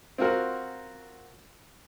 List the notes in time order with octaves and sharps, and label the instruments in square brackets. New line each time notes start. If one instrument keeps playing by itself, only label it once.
[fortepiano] C4 F4 F#4 A#4 F#5